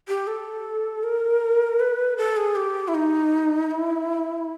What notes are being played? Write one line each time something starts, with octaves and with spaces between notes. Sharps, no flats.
G4
A4
A#4
B4
A4
G#4
G4
E4
D#4
E4